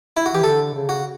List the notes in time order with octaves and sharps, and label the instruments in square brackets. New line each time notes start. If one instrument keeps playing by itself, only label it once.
[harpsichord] E4
F#4
[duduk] E3 [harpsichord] G4
[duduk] D3 [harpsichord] A4
[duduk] C#3
[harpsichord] F#4